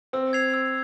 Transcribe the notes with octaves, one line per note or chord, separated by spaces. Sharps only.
C4 E6
G#6 C7 F7
E6